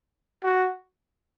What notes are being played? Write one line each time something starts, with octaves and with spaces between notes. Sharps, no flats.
F#4